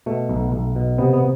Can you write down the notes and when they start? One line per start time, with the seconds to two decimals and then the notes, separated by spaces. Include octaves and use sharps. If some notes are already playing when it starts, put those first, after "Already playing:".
0.06 B2 A3
0.29 B1
0.52 B1
0.76 B2
0.98 C3 B3
1.13 B3